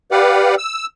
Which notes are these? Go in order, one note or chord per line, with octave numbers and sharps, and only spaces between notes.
G4 B4 D5 F5 F#5
E6